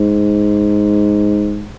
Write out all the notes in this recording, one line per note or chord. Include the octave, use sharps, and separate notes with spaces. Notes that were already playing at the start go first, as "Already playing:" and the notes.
Already playing: G#2